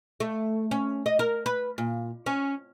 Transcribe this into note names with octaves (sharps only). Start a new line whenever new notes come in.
A3
C#4
D#5
A#4
B4
A#2
C#4